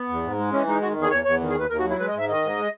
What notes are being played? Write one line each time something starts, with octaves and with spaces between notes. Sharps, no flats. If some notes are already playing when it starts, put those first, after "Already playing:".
Already playing: B3
E2
G#2
G#3
E3 C#4
G#3 D#4
D#3 F#4
E2 G#4
E2 C#5
E2 C#5
D#3
G#4
D#2 B4
D#2 A#4
F#4
F#3
E4
G#3 B4
D#5
G#2 E5
D#3 D#5
G#2
G#3